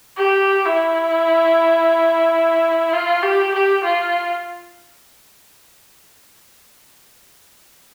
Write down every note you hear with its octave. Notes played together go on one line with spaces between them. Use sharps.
G4
E4
F4
G4
G4
F4